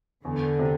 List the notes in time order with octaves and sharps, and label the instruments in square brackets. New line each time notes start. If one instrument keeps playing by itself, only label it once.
[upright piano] E2 [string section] D3
[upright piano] C3